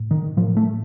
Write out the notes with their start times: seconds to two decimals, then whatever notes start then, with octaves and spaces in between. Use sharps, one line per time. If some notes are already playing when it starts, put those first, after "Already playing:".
Already playing: A2
0.11 D#3
0.37 A2 F3
0.57 A3